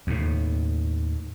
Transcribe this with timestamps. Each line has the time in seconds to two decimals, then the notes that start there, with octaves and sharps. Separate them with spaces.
0.07 D#2 A2